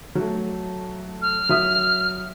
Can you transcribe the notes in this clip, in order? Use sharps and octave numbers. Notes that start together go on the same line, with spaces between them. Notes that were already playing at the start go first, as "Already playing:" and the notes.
F#3 A3
F6
F#3 E5 D#6